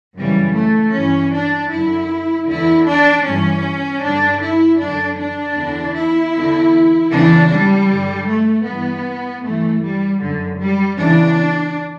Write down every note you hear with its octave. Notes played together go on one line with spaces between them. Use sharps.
F#2 C#3 E3 G3
A3
G2 E3 C#4
D4
F#2 D3 E4
E2 D3 E4
D4
G2 E3 C#4
G2 D3 D4
E4
F#2 D3 D4
D4
E2 D3
E4
E2 D3
E2 C#3 E3 D4
G3
G2 D3
A3
G2 E3 B3
G2 E3 A3
G3
F#2 D3
G3
E2 C#3 E3 D4